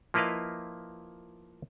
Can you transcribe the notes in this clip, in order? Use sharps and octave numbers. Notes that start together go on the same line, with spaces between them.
F3 A#3 E4 B4 D#5 F5